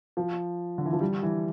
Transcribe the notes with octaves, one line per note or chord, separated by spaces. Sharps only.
F3
D3
E3
F3
G3
E3